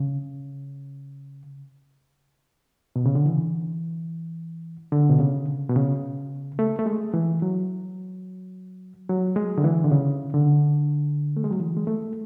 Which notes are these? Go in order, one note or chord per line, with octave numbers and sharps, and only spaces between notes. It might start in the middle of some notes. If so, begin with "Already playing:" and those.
Already playing: C#3
B2
C#3
D3
E3
D3
B2
C#3
B2
C#3
A3
A3
G#3
E3
F#3
F#3
G#3
D3
E3
D3
C#3
D3
A3
G#3
F#3
E3
G#3
A3